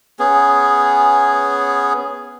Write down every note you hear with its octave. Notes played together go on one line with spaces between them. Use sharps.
B3 C#4 G#4